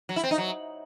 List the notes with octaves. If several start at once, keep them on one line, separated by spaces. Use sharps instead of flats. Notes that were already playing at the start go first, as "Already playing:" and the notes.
F#3
E4
C4
D#4
F#3